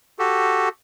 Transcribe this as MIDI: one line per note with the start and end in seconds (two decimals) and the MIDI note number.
0.19 0.69 66
0.19 0.69 67
0.19 0.69 69